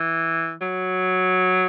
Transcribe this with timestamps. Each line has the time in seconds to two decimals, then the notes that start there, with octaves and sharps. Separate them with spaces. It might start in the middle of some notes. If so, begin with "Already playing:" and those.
Already playing: E3
0.61 F#3